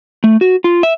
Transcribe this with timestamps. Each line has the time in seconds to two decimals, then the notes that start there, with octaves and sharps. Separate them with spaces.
0.24 A3
0.41 F#4
0.64 F4
0.83 E5